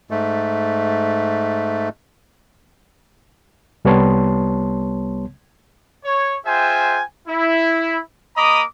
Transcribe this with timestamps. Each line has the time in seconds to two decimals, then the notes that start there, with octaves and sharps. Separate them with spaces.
0.11 G#2 A3
3.85 C2 G3 B3 C#5 A5 C6
6.05 C#5
6.46 F4 G#4 C5 E5 G5 G#5
7.28 E4
8.37 A#3 D#5 A#5 B5 D6 D#6